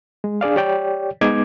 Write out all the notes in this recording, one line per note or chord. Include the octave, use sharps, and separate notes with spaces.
G#3
D4 G#4 D5 F5
G4 C#5 D5 G5
G#3 B3 D#4 D6 G#6